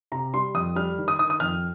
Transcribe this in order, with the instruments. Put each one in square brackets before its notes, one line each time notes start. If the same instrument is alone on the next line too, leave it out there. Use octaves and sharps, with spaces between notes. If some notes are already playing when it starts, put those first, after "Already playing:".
[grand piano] C3 A#5
G3 C6
F2 D#6
G3 F6
D#3
D#6
D#3 D#6
D#6
F2 F6